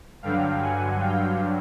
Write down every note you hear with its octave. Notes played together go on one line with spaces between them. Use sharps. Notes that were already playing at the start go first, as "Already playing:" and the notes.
G2 D3 F#3 F5 G5
F#5 G#5
F5 G5